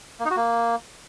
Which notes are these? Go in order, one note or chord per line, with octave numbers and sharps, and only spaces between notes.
A#3
D#4
F#4
A#3